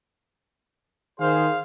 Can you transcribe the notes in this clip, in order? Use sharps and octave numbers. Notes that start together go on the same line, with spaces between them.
D#3 G#4 C5 F5